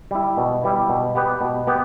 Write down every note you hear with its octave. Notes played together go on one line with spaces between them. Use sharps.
G3 E4
B2
G3 E4
B2
B3 G4 B4
B2
B3 G4 B4